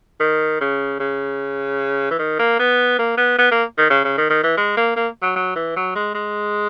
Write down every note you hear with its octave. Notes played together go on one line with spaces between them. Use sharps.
D#3
C#3
C#3
E3
D#3
A#3
B3
A#3
B3
B3
A#3
D#3
C#3
C#3
D#3
D#3
E3
G#3
A#3
A#3
F#3
F#3
E3
F#3
G#3
G#3